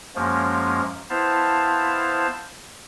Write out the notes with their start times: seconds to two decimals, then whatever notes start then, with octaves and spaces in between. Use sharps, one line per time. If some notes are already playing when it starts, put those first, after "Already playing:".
0.15 F#2 F3 G#3 A#3 C#4
1.10 B3 E4 C5 F5 A5